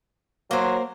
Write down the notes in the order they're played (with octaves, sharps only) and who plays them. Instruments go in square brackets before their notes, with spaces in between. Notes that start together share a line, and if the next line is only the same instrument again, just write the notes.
[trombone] F#3 [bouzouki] A#3 C5